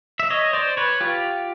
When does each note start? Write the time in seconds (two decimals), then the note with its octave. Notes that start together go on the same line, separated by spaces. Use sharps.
0.20 E5
0.30 C#5 D#5
0.53 C5 D5
0.77 B4 C#5
1.01 F4 G4